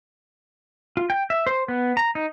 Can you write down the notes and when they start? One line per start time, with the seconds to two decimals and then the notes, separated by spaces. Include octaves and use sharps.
0.97 F4
1.10 G5
1.30 E5
1.47 C5
1.68 B3
1.97 A#5
2.15 D#4